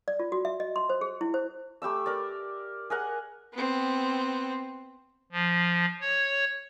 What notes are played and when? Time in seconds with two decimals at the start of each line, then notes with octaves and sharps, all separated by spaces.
0.08 D5
0.20 F4
0.32 F#4
0.45 E5
0.60 D#5
0.76 C6
0.90 C5
1.01 G#4
1.21 E4
1.34 C5
1.82 A3 G4 B5 E6
2.06 A#4 D5
2.90 G#4 A#4 F#5
3.53 B3 C4
5.32 F3
6.01 C#5